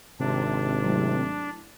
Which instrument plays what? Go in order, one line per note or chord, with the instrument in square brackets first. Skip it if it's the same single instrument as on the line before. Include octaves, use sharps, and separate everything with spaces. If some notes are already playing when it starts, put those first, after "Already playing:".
[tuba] G#1 [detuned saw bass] C3 [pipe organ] D4
[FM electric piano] F#3 A3 E4